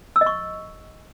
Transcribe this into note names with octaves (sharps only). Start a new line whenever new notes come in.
E6
D#5
C#6